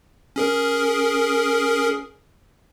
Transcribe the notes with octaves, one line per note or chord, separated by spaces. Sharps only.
C#4 G#4 A#4